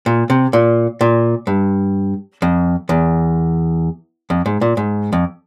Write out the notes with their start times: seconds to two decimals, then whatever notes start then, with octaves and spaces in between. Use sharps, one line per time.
0.06 A#2
0.30 C3
0.53 A#2
1.01 A#2
1.47 G2
2.42 F2
2.89 E2
4.30 F2
4.46 G#2
4.61 A#2
4.77 G#2
5.13 F2